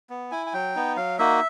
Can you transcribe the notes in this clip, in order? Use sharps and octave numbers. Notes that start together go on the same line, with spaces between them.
B3
E4 G#5
G#5
F#3 G5
B3 D#4
F#3 F5
A#3 D#4 F#4 E5